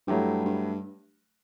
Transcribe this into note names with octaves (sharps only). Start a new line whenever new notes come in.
G2 F#3 A3 E4 G4
G2